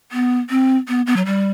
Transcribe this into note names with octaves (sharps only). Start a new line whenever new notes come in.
B3
C4
B3
B3
F#3
G3